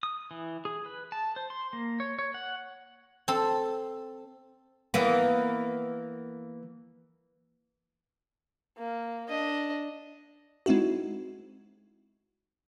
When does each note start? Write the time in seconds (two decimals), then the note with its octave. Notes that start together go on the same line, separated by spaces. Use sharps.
0.03 D#6
0.31 E3
0.65 G#4
0.86 B4
1.12 A5
1.36 C5
1.50 C6
1.73 A#3
2.00 C#5
2.19 C#5
2.34 F#5
3.28 C4 A4
4.94 E3 A#3 B3
8.78 A#3
9.28 D4 D#5
10.66 G#3 C4 D#4 E4 F#4